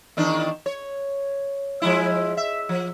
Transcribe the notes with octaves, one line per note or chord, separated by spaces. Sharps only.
E2 D#3 D4
C#5
F3 G#3 E4
E5
F3